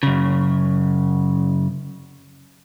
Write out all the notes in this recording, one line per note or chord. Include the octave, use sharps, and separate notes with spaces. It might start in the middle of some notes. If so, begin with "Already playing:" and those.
F#2 C#3